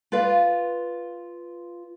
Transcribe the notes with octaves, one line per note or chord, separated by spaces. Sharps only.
F4 B4 D5 F5